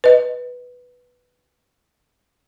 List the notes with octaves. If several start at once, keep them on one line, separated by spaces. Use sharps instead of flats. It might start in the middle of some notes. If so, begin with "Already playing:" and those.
B4 D#5